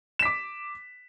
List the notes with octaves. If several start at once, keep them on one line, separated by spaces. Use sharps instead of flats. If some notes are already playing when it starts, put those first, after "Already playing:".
D6 B6 E7